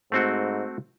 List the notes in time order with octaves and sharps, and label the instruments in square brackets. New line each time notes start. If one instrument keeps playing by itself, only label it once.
[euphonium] G#2 [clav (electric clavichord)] A3 C4 F#4